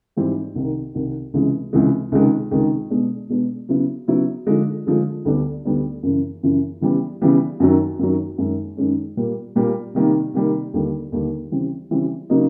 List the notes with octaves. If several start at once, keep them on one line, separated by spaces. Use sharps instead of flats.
G#2 E3 G3 C4
C2 C3 D#3
C2 C3 D#3
C#2 C3 E3 G#3
C#2 C3 E3 G#3
C#2 C3 D#3 G#3
C#2 C3 D#3 G#3
B2 G#3 B3 D4
B2 G#3 B3 D4
C#3 F#3 B3 E4
C#3 F#3 B3 E4
D3 F3 G#3
D3 F3 G#3
D2 D3 G3 B3 D4
D2 D3 G3 B3 D4
F#2 C#3 E3
F#2 C#3 E3
C#3 E3 G3 B3
C#3 E3 G3 B3
F#2 D#3 F#3
F#2 D#3 F#3
F#2 D#3 G#3 C#4
F#2 D#3 G#3 C#4
A#2 G3 A#3
A#2 G3 A#3
C3 D#3 G3 A#3
C3 D#3 G3 A#3
D#2 D3 G3
D#2 D3 G3
C#3 E3 G3 C4
C#3 E3 G3 C4
C#3 F#3 A#3 D#4